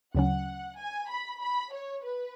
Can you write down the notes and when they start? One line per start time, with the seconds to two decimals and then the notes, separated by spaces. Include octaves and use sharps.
0.14 D2 C#3 F#3 C#4 F#5
0.77 G#5
1.09 B5
1.41 B5
1.72 C#5
2.04 B4